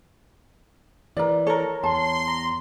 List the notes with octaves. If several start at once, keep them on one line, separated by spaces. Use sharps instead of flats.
E3 A#4 D5
A4 A#4 C#5 A#5
E2 A5 C6
A#5